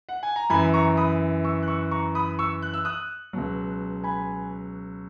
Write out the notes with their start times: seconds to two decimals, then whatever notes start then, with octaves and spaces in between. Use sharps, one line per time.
0.09 F#5
0.23 G#5
0.36 A#5
0.50 F#2 E3 G#5 B5
0.74 A#5 C#6
0.97 B5 D#6
1.44 C#6 E6
1.63 F#6
1.68 C#6 E6
1.91 A#5 C#6
2.15 B5 D#6
2.39 C#6 E6
2.62 F#6
2.74 E6
2.85 D#6 F#6
3.33 C#2 B2 F#3
4.04 G#5 B5